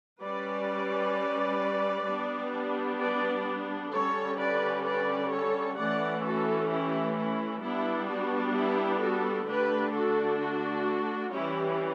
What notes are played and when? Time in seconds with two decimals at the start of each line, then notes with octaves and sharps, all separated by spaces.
0.23 G3 C#4 B4 D5
2.08 G3 B3 D4
3.01 B4 D5
3.93 D3 G3 C#4 A4 C#5
4.39 B4 D5
4.85 B4 D5
5.32 A4 C#5
5.78 E3 A3 C#4 D5 F#5
6.24 F#4 A4
6.70 E4 G4
7.17 E4
7.63 G3 B3 D4 E4
8.09 F#4
8.55 E4 G4
9.02 F#4 A4
9.48 D3 A3 D4 G4 B4
9.94 F#4 A4
10.41 F#4
11.33 E3 G3 C#4 E4 G4